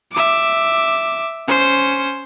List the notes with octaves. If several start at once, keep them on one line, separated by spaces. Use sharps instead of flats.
E5 D6
C#4 C5